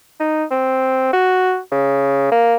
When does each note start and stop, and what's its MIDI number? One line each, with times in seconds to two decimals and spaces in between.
0.20 0.44 63
0.51 1.08 60
1.13 1.58 66
1.72 2.28 49
2.32 2.57 58